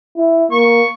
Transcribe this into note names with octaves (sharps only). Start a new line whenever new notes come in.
E4
A#3 C#6